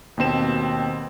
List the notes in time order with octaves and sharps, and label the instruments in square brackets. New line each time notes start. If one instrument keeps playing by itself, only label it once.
[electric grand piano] D#2 B2 C4 E7